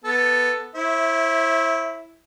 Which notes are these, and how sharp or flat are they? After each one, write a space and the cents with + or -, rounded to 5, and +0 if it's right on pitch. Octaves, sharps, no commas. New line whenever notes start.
B3 -5 A4 +0
E4 +0 C5 +45 E5 -15